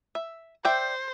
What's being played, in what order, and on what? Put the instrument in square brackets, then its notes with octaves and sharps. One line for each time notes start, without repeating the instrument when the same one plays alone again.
[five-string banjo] E5
[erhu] C5 [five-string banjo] D5 E5 G5